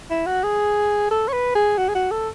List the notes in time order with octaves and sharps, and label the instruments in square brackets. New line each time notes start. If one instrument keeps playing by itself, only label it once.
[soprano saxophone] E4
F#4
G#4
A4
C#5
B4
G#4
F#4
G#4
F#4
A4